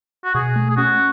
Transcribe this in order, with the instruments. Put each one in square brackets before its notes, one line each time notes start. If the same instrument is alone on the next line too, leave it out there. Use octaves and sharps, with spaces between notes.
[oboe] F#4
[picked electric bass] B2 [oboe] G#4
[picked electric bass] A3
[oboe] G#4
[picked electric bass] C#4 [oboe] F#4